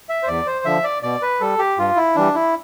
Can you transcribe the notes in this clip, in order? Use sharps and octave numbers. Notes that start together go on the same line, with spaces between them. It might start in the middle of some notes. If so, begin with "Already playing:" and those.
E5
C5
E2 D5
C5
D3 F3 E5
D5
B2 D5
B4
G3 A4
G4
G2 F4
E4
E3 G3 D4
E4